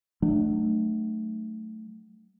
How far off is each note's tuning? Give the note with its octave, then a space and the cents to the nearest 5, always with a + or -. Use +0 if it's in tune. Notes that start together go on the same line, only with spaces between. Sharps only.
F#3 +20 A3 -5 D4 +35